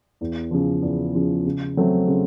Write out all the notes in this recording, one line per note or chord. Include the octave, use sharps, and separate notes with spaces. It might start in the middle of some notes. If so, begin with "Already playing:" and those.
E2
C#3 F3
E2
C#3 F3
C#3
F#3 A3 C4
C#3